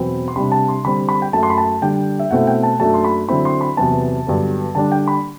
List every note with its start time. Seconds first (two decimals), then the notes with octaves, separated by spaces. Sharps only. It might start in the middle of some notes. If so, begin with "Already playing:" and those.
Already playing: E2 B2 F#3 C4 B5
0.28 C6
0.36 C3 G3 D4 B5
0.52 A5
0.68 C6
0.85 D3 G3 C4 B5
1.09 B5
1.22 G5
1.33 F#2 F#3 A3 A5
1.43 C6
1.50 B5
1.58 A5
1.82 D3 G3 D4 G5
2.19 E5
2.31 B2 A3 C4 E4 F#5
2.47 G5
2.63 A5
2.80 F#2 F#3 A3 D4 A5
2.94 C6
3.04 B5
3.29 D3 F#3 C4 E4 B5
3.45 C6
3.61 B5
3.77 E2 C3 F#3 B3 A5
4.27 G2 D3 F#3 B3
4.75 D3 G3 D4 A5
4.92 G5
5.08 B5